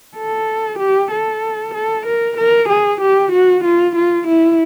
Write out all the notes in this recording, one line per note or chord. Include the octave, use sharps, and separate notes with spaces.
A4
G4
A4
A4
A#4
A#4
G#4
G4
F#4
F4
F4
E4